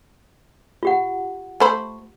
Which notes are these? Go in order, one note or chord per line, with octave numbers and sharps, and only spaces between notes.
F4 G4 F#5
A3 C5 B5